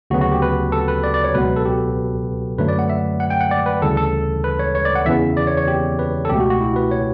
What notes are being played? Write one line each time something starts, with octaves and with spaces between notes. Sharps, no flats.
D2 C#3 F#3 B3 F#4
F#4
G4
B4
A4
B4
D5
D5
C#5
C#2 B2 F#3 B3 B4
A4
G4
F#2 D3 F#3 A3 B4
D5
F#5
E5
F#5
G5
F#5
D5
B4
D2 C#3 E3 G3 A4
A4
B4
C#5
C#5
D5
F#5
E2 C#3 E3 B3 E5
D5
C#5
C#5
G4
B4
A4
C#2 B2 A3 G4
F#4
F#4
E4
B4
C#5